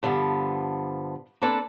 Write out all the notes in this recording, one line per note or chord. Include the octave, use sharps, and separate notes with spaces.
G2 D3 F3 B3
A#3 C4 D4 A4 B4